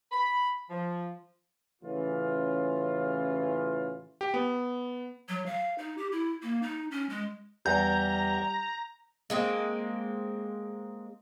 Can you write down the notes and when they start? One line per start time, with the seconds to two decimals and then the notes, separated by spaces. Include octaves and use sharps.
0.11 B5
0.70 F3
1.82 A1 C#3 E3 C#4 F4
4.21 G4
4.34 B3
5.29 F#3
5.46 F5
5.78 D#4
5.98 G4
6.12 E4
6.42 A#3
6.63 D#4
6.91 C#4
7.09 G#3
7.66 E2 G3 A#5 G6
9.30 G#3 A#3 C4